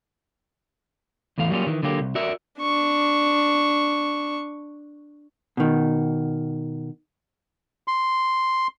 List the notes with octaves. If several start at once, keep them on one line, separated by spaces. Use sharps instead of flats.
E2 A2 E3 F5
F#3 G3 A#3 C#4 F4
D#3 E3
D3 F#3 A#3 G4
C2
F#4 A#4 D5 E5
D4 C#6
B2 D#3
C6